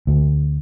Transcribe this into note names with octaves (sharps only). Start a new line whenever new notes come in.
D2